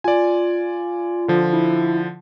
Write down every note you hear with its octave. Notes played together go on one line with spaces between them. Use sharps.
F4 D5 G#5
D3 F3
E4